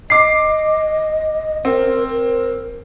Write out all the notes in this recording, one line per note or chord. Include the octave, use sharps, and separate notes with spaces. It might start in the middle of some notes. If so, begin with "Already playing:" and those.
D#5 D6 C7
C4 A#4
A#4